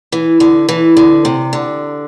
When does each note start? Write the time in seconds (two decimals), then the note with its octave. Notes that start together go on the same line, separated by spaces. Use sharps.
0.12 E3
0.40 D3
0.69 E3
0.97 D3
1.25 C3
1.53 D3